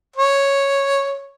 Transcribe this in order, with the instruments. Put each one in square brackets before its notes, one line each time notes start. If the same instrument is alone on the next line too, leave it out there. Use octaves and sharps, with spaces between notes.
[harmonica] C#5